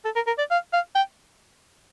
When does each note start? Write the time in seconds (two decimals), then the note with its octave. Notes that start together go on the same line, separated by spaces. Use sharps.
0.05 A4
0.16 A#4
0.27 A#4
0.38 D5
0.51 F5
0.73 F5
0.95 G5